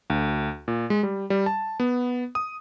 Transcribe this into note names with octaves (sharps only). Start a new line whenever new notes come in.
D2
A#2
G#3
G3
G3
A5
B3
D#6